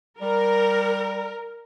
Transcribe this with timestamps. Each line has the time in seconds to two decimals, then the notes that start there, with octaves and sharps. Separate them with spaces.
0.21 G3 A#4